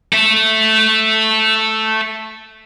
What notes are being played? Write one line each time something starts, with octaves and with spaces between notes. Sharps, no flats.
A4 E5